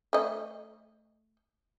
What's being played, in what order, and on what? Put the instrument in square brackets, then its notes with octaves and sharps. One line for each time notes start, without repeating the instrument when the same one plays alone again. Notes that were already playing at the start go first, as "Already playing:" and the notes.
[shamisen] A3 D#5